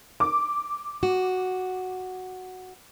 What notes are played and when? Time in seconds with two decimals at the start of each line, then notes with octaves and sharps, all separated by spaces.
0.20 D6
1.03 F#4